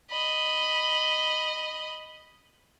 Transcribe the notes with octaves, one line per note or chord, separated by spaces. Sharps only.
D#5 B5